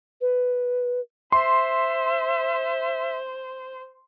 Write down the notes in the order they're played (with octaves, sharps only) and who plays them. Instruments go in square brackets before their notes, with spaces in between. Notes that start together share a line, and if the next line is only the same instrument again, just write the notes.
[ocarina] B4
[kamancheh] C5 [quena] E5 [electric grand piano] C6